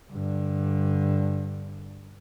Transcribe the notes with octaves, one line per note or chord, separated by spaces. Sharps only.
G2 D3